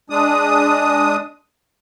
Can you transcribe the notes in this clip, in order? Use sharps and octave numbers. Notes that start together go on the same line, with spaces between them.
G#3 D4 D#6